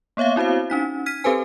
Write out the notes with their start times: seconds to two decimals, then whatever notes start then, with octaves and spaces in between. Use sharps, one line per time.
0.17 A#3 B3 C#5 E5 F5
0.36 C4 E4 F#4 C5 F5
0.70 C#4 D#4 B6
1.06 F6 G#6 B6 D#7
1.24 C4 G4 A4 B4 C5 G#5